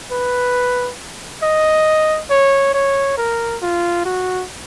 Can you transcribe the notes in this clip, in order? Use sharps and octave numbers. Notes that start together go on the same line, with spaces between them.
B4
D#5
C#5
C#5
A#4
F4
F#4